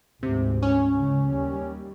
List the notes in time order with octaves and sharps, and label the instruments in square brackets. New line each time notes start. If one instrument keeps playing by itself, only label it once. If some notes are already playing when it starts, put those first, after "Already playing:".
[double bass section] D2 G#2 [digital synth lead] C3
[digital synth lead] C#4
[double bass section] C#2 C#3
D#2 G3